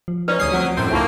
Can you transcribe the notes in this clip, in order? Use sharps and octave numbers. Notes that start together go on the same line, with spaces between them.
F3
C#4 D#4 B4 D5
D2 G3 D#6 C7
F3 F#3 C4
A#1 F#2 A2 C4
C#2 A#3 D#4 F4 C#6